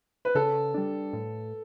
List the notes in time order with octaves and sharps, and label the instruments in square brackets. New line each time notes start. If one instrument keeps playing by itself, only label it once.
[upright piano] B4
[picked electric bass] C#3 [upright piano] A4
[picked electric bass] G3 D4
A2